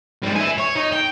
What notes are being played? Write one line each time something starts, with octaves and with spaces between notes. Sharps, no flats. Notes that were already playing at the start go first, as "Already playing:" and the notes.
G#2 G3
E5 G#5
C#5
D#4
G5